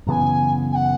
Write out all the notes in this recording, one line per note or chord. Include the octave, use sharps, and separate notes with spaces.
F#2 C#3 E3 B3 G#5 A#5
G#5
F#5